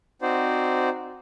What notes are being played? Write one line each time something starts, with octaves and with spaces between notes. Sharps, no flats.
C4 D#4 F#4 C5 D5